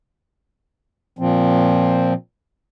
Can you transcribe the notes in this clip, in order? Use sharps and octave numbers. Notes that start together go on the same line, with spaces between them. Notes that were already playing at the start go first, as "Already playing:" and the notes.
A#2 F3 C4